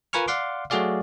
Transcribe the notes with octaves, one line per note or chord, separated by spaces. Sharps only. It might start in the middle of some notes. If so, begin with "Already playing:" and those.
F4 A#4 B4 G#5 C#6 F6
D5 F5 F#5 C6 D6
F#3 A3 F#4 G#4 D5 F5